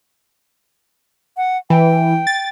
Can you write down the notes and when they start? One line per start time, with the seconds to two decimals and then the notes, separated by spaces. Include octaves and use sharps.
1.37 F#5
1.70 E3 G5
2.27 A6